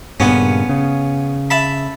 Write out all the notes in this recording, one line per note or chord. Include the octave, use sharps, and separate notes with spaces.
G2 A#2 C#3 B3 C#4
C#3
E5 A5 B5